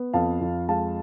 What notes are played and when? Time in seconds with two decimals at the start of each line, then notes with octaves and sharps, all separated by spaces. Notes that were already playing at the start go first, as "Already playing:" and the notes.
Already playing: B3
0.13 F2 F5 A5
0.41 F2
0.68 G#3 F5 A5